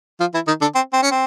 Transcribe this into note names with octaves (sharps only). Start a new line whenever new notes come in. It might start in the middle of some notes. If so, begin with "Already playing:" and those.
F3 F4
E3 E4
D#3 D#4
D3 D4
C4
C4
C#4
C4